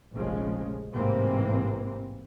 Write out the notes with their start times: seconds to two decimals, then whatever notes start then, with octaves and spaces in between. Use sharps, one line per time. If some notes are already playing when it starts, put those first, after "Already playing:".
0.15 F1 A#1 C#3 F3 G#3
0.93 A1 G#2 C3 E3 A#3 C4